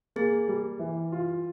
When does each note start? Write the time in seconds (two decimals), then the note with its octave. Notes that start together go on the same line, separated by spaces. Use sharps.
0.16 A#3 G#4
0.48 G3
0.79 E3
1.12 F4